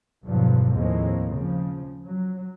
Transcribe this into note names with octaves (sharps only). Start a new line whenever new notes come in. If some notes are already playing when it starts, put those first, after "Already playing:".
E2 G2 B2 D3 F3 F#3
D#2 A2 F3 G#3 A#3 C4
C#3 F3
F#3